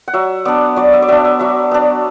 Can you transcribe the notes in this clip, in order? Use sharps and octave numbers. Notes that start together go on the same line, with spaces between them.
F#5
F#3 E5
B3 D4 D5
F#3 D5
E5
D5
B3 D4 E5
E5
F#3 E5
B3 D4